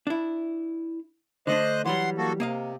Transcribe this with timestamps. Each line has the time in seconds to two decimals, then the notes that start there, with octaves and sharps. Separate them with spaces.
0.07 D4 E4
1.47 D3 A3 D4 C5 D#5 F#6
1.85 E3 F#3 G3 F#5 C6
2.18 A#3 F#4 A4
2.40 C3 A#3 D#5 F5